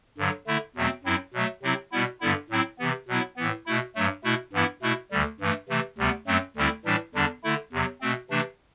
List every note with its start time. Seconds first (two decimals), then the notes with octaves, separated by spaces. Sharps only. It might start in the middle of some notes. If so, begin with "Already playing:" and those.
0.18 G2 D3 F#3
0.47 D3 A3 E4
0.76 E2 B2 F#3 A3 C4
1.05 F#2 F#3 C4 E4
1.33 B2 F#3 A3
1.63 C3 F#3 C4 E4
1.92 B2 G3 B3 E4
2.21 G2 D3 G3 B3 E4
2.50 A2 F#3 C4 E4
2.79 C3 E3 B3
3.08 B2 F#3 B3 E4
3.36 A2 E3 B3
3.66 B2 A3 E4
3.95 G2 F#3 A3
4.24 B2 A3 E4
4.53 G2 E3 B3 E4
4.82 B2 A3 E4
5.11 D2 D3 G3
5.40 G2 E3 A3
5.69 C3 E3 A3
5.98 D2 C3 G3 B3
6.27 F#2 F#3 A3 C4
6.56 D2 D3 G3 C4 E4
6.85 A2 E3 G3 D4
7.14 E2 D3 G3 D4
7.44 D3 A3 E4
7.72 E2 C3 F#3
8.01 B2 A3 C4
8.30 C3 E3 A3 D4